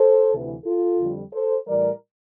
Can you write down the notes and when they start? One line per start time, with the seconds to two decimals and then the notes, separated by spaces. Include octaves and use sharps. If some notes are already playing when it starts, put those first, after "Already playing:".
Already playing: A4 C5
0.32 D2 C3 E3
0.65 F4 A4
0.98 F2 D3 G3
1.32 A4 C5
1.66 A2 E3 G3 A#4 D5